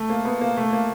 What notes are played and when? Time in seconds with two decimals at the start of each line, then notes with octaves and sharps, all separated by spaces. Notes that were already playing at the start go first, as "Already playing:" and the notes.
Already playing: A3
0.09 A#3
0.25 B3
0.41 A#3
0.57 A3
0.73 A#3